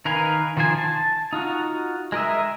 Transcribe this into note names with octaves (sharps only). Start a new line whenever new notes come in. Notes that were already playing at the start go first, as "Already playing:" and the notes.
D#3 A#4 B4 F5 G#5
D#3 F3 F4 C5 G#5
A5
D#4 F4 F#4
G#3 A#4 D#5 E5